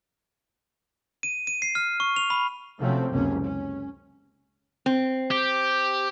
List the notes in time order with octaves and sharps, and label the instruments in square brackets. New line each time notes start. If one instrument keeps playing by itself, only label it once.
[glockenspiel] D#7
D#7
C7
F6
C#6
F7
B5
[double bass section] C3 F3 F#3 A3 C4 C#4
F#1 C#2 C3 A#3 C#4
C#4
[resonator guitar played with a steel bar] C4
[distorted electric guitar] G4